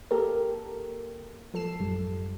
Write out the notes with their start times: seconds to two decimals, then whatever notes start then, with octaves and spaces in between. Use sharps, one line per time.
0.11 A#3 G4 A4 A#4
1.54 F3 A4 C7 E7
1.79 A1 F#2 G3